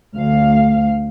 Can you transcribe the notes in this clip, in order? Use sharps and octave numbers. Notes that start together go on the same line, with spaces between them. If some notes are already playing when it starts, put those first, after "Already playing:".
D2 F5